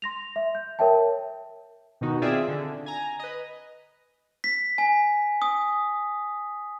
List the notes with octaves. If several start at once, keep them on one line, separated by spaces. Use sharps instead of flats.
C6 A#6 F7
E5
G6
A#4 C#5 E5 G5 A5
B2 D#3 D#4 F#4
C4 F4 G#4 D5 E5
D3
G#5 A#5
B4 D#5
B6
G#5
D#6